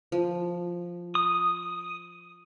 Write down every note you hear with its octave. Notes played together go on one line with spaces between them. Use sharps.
F3
D#6